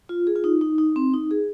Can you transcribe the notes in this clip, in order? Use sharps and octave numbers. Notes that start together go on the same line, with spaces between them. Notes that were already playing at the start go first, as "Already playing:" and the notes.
F4
G#4
F4
D#4
D#4
D#4
C4
D#4
G#4